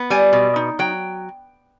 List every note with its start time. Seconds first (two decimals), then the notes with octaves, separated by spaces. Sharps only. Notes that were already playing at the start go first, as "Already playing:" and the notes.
Already playing: B3
0.10 G3 G#5
0.33 B2
0.56 D#4
0.79 F#3 G5